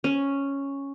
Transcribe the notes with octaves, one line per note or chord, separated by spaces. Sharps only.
C#4